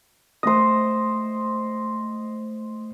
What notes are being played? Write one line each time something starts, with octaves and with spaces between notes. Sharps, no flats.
A3 C5 D#5 D#6